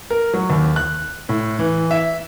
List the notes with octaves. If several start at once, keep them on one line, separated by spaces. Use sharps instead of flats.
A#4
F#3
D#2
F#6
A2
E3
E5